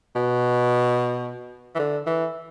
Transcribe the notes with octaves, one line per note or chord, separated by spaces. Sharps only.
B2
E3
D3
E3